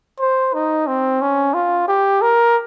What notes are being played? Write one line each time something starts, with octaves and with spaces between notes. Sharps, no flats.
C5
D#4
C4
C#4
F4
G4
A#4